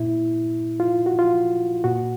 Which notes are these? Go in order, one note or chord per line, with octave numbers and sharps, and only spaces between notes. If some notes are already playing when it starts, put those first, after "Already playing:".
Already playing: A#2 E4
F4
F#4
F4
A#2 F#4